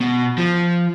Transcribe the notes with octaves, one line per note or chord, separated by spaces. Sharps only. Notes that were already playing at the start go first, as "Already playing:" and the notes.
B2
F3